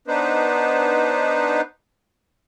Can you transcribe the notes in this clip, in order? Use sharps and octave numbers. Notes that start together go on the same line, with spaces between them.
B3 D4 D#4 B4 C5